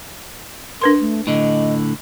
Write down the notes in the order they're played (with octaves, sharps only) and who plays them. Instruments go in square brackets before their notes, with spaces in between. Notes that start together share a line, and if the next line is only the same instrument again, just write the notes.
[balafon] D4 B4 C6 [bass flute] A#4
[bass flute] A3
[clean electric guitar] A2 D3 [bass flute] D#5